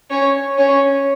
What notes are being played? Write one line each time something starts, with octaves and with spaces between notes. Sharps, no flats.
C#4 C#5
C#4 C#5